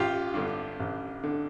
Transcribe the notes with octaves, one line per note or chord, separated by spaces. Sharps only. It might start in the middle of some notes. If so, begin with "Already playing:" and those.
Already playing: A1 F4 G4
G2 D3
A1
D3